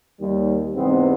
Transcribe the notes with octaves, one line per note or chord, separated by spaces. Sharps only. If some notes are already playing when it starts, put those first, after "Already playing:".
D#2 G3
E2 G#2 C3 B3 C4